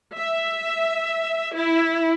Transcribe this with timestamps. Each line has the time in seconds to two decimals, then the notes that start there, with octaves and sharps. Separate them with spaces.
0.16 E5
1.55 E4